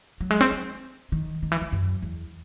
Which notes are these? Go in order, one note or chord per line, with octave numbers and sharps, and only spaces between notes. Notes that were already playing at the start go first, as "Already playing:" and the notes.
F#3
G#3
C4
C4
D#3
D#3
E3
D#3
F#2
E2